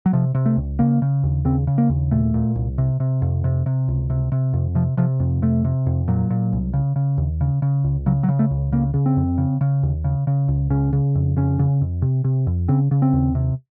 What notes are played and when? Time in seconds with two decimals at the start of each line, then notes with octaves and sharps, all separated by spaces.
0.06 F#3
0.13 C3 F3
0.35 C3
0.46 A3
0.57 C#2
0.79 C#3 A#3
1.02 C#3
1.23 D#2
1.45 C#3 C4
1.67 C#3
1.78 A#3
1.89 D#2
2.11 A#2 A3
2.34 A#2
2.55 C2
2.78 C3
3.00 C3
3.22 F2
3.44 C3
3.66 C3
3.88 C#2
4.10 C3
4.32 C3
4.53 F2
4.75 C3 F3
4.97 C3 F3
5.20 F2
5.42 C3 A3
5.64 C3
5.86 F2
6.08 A#2 F#3
6.30 A#2
6.53 C2
6.73 C#3
6.96 C#3
7.18 D#2
7.41 C#3
7.62 C#3
7.84 C#2
8.06 C#3 F#3
8.23 F#3
8.28 C#3
8.39 A3
8.51 C#2
8.72 C#3 A#3
8.94 C#3
9.06 C4
9.17 F2
9.38 C#3
9.61 C#3
9.83 D#2
10.04 C#3
10.27 C#3
10.48 C#2
10.70 C#3 C#4
10.93 C#3
11.15 F2
11.37 C#3 C#4
11.59 C#3
11.81 F2
12.02 C3
12.24 C3
12.47 F2
12.68 C#3 C4
12.91 C#3
13.02 C4
13.13 D#2
13.35 C3